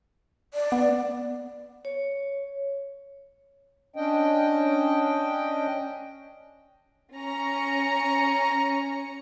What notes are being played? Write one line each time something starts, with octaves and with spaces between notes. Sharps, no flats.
D5
B3
C#5
C#4 D4 D#5 G5
C#4 A#5 C#7